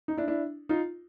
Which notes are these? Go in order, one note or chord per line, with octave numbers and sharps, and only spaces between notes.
D#4
D4 E4
D4 E4
D#4 F4